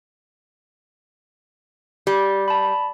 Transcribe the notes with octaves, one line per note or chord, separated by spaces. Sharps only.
G3 G4
A5 B5